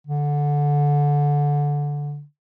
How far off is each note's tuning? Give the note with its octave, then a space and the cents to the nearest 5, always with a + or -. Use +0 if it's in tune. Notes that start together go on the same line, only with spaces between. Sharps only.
D3 -15